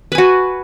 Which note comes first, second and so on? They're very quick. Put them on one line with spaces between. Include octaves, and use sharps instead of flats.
B4 G#5 F#4